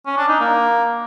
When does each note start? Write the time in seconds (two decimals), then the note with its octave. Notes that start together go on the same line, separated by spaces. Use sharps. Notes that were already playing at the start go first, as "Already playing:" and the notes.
0.06 C#4
0.17 D4
0.28 D#4
0.39 A#3